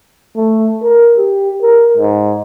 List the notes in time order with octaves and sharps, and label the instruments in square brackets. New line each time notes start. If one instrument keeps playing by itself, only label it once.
[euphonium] A3
A#4
G4
A#4
G#2